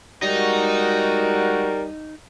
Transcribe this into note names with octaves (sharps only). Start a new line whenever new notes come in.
G3 G#3 D#4 F#4 A#4